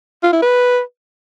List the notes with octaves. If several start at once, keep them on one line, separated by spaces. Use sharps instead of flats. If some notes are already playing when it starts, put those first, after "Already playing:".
F4
E4
B4